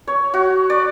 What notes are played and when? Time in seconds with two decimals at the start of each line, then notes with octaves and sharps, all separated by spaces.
0.07 C#5
0.34 F#4
0.70 D5